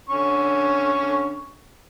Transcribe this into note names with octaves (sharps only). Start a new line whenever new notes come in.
D3 C#4 C#6